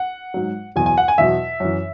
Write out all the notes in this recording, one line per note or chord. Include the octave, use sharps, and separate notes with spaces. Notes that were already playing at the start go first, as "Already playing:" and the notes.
Already playing: F#5
G#2 F#3
E2 B2 F#3 G#5
G#5
F#5
G#5
E2 B2 F#3 E5
F#2 E3